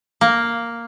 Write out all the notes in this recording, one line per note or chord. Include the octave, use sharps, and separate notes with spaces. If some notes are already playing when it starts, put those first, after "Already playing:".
A#3